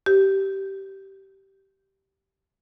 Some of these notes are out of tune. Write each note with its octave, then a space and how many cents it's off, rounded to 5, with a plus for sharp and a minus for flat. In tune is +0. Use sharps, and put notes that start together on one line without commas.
G4 -15